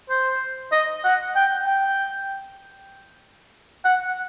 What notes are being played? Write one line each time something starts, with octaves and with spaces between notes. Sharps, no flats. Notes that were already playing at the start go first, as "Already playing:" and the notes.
C5
D#5
F#5
G5
G5
F#5